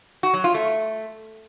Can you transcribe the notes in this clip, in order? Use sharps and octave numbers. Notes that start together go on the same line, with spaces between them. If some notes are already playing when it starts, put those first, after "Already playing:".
F#4
F#3
F4
A3